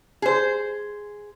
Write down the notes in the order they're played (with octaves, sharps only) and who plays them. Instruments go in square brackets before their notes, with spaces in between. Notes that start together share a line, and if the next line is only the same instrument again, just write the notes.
[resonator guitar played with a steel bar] G#4 C5